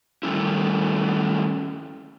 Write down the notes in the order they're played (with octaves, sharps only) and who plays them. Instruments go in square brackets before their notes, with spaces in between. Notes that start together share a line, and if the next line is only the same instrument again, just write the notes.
[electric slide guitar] D#3 G3 A3 C#4 E4